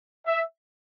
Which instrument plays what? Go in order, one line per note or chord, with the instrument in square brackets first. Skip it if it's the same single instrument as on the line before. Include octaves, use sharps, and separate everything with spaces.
[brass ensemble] E5